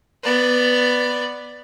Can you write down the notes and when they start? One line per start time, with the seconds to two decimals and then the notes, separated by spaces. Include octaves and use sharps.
0.23 B3 D5